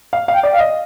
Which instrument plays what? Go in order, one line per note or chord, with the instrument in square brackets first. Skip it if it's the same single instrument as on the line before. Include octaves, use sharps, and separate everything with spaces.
[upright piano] F5
[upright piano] F5 [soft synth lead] G5
[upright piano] D5
[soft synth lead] F5
[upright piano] D#5